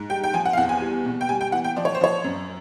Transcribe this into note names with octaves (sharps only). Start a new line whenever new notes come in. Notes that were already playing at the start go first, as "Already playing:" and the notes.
Already playing: G#2
G3 G5
G5
F3 G#5
F#5
F5
E2 F#5
G#5
G3
B2
G5
G3 G#5
G5
E3 F#5
G5
F3 D5
C#5
C5
F3 C#5
F#2